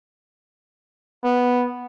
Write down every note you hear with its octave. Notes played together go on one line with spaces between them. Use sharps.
B3